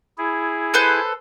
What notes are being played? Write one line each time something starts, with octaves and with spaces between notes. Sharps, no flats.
E4 G#4
A4 B4 C5